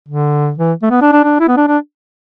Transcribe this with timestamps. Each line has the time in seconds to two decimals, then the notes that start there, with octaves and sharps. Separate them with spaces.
0.08 D3
0.58 E3
0.82 A3
0.91 B3
1.02 D4
1.12 D4
1.24 D4
1.40 E4
1.48 B3
1.57 D4
1.68 D4